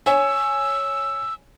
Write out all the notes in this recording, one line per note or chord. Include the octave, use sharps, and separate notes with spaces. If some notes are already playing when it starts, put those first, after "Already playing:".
C#5 G#5 E6